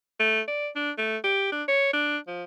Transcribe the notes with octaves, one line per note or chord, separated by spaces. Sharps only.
A3
D5
D4
A3
G4
D4
C#5
D4
F3